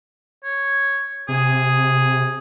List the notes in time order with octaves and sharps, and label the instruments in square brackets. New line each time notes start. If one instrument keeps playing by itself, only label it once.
[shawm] C#5
[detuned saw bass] C3 [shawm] G#4